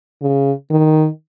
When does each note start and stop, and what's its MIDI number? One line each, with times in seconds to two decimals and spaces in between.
0.22 0.52 49
0.70 1.07 51